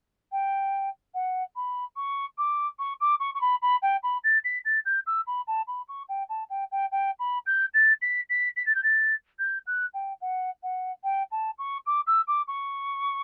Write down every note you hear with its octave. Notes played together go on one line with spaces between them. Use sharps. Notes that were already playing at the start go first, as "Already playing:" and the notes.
G5
F#5
B5
C#6
D6
C#6
D6
C#6
C#6
B5
B5
G5
B5
A6
B6
A6
G6
E6
B5
A5
B5
C#6
G5
A5
G5
G5
G5
B5
G6
A6
B6
B6
B6
A6
G6
A6
G6
F#6
G5
F#5
F#5
G5
A5
C#6
D6
E6
D6
C#6